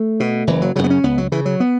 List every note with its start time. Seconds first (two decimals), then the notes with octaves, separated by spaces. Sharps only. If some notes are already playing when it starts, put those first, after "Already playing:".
Already playing: A3
0.20 B2
0.47 F#1 E3
0.62 F#3
0.76 F#2 C#3 F#3
0.84 B3
0.90 C#4
1.04 C#2 B3
1.18 F#3
1.32 C#3 E3
1.46 F#3
1.60 B3